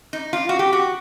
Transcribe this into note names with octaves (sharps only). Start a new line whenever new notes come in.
D#4
F4
F#4
G4
F#4